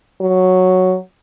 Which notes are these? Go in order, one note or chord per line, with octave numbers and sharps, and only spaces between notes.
F#3